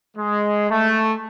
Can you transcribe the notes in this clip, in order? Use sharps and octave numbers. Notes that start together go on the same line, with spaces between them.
G#3
A3